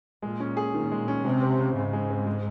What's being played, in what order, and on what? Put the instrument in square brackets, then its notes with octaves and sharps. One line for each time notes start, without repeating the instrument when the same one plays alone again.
[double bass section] A#2 [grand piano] G#3
[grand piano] C#4
G#4
[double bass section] A#2 [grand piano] D#3
[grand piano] G#3
C#4
[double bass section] C3 [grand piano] G#3
[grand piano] C4
C#3
[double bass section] G#2 [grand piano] C#3
[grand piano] G#3
C4
G#3